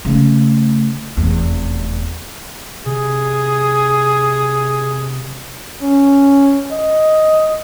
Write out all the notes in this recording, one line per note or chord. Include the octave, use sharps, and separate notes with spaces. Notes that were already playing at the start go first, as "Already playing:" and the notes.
C#3 A3
F1 E2
C3 G#4
C#4
D#5